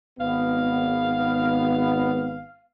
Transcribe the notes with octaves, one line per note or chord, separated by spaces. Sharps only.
G#1 B3 F5